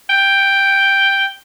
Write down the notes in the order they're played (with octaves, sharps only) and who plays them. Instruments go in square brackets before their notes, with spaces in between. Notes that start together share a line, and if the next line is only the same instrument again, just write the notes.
[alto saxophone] G5